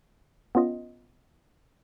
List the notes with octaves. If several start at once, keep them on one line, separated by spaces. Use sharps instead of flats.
B3 C#4 F4 D#5